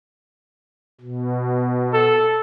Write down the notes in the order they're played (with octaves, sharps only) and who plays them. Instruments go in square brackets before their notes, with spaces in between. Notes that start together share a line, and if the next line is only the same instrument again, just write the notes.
[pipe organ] B2
[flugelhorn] A4